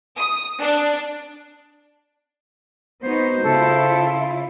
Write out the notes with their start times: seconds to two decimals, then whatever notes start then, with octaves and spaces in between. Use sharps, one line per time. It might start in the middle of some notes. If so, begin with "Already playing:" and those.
0.19 D#6
0.61 D4
3.03 B3 D#4 F#4 C5
3.43 C#3 E4 F4 A4